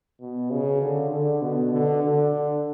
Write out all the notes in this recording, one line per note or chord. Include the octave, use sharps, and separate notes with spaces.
B2
C#3
D3
D3
B2
D3
D3